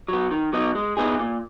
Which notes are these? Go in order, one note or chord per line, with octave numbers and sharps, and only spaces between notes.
F#3 B3
D#3
F#3 B3 D#4
G#3
B3 D#4 G#4
A#2